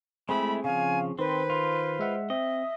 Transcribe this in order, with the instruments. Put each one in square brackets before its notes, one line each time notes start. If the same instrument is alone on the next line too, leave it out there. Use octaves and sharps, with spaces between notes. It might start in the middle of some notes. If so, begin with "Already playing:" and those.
[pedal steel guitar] G#3 A3 E4 [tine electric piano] C4 G#4 [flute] B5
[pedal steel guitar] C#3 F3 [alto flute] F5 [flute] G#5
[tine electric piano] D#3 [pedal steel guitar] C4 [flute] B4 [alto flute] C5
[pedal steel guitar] F4
[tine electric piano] G#3 E5 F#5
[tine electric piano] C4 [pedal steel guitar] D#5 [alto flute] E5